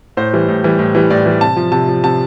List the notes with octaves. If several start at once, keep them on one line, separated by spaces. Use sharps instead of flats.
A2 C5
E3 G3
A2
E3 G3
A2
E3 G3
A2 D5
E3 G3
C3 A5
F3
C3 A5
F3
C3 A5